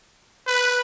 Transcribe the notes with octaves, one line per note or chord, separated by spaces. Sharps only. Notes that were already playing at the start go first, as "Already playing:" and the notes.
B4